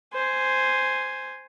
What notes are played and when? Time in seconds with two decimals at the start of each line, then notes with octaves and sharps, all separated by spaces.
0.13 C5 G#5